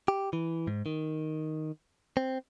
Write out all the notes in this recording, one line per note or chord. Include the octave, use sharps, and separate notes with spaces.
G4
E3
G#2
D#3
C4